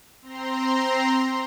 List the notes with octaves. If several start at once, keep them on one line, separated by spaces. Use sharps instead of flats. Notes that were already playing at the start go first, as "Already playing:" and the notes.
C4 A#5 C6